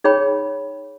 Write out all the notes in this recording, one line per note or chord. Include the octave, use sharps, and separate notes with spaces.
D#4 G#4 C#5 G5 B5